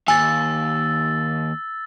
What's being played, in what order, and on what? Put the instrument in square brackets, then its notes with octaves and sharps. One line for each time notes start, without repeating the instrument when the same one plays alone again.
[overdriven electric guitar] D#2 [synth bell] G#5 [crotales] E6 A6